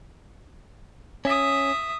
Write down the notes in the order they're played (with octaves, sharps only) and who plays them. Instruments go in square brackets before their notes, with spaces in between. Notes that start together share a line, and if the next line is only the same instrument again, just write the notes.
[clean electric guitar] C#4 [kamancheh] E5 D#6